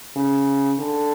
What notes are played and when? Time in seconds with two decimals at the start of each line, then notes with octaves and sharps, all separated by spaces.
0.17 C#3
0.79 D3